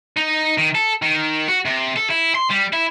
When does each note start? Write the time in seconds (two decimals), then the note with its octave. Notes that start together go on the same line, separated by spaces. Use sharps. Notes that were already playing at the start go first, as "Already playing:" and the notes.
0.17 D#4
0.58 D#3
0.75 A4
1.02 D#3
1.48 F#4
1.65 C3
1.96 A4
2.10 E4
2.35 C6
2.50 G3
2.73 E4